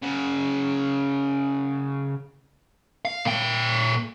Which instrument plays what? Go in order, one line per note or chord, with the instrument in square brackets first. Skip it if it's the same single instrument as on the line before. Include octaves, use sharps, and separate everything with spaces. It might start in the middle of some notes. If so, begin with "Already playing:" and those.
[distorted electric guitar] C#3 F#4
[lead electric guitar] F5
A#2 G5